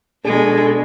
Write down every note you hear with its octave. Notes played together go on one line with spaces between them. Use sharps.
B2 G#3 D4 G#4 A4